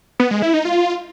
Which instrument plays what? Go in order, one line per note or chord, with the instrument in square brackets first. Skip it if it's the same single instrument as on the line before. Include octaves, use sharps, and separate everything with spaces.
[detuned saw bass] B3
G#3
E4
D#4
F4